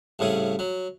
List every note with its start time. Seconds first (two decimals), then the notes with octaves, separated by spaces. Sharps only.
0.19 C2 A2 C#3 G#4
0.59 F#3